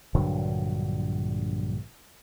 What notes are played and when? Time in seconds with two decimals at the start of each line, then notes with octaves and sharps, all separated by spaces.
0.15 A#1 G2 D3 F#3